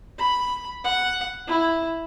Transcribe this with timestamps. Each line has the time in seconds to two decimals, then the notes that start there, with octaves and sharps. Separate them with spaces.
0.18 B5
0.84 F#5
1.48 E4